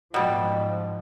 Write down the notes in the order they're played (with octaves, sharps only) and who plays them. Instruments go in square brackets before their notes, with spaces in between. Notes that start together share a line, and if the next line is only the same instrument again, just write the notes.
[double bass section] G#2 F3 [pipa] B2 G3